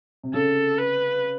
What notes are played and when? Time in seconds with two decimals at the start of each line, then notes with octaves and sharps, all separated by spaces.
0.23 C3
0.33 C#3 A4
0.78 B4